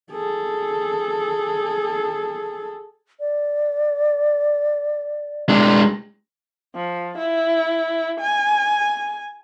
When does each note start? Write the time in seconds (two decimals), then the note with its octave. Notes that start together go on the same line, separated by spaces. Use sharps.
0.12 G#4 A4
3.20 D5
5.49 G#3 D4
6.75 F3
7.18 E4
8.20 G#5